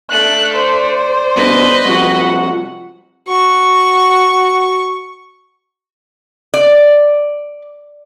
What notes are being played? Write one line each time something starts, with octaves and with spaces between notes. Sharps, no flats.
A3 D4 F#6
C5 D5
C2 B2 D3 B4 D#5
G2 C3 F3 F#4 F#5
F#4 C#6
D5